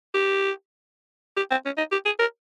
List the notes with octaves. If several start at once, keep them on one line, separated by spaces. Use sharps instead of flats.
G4
G4
C4
C#4
D#4
G4
G#4
A#4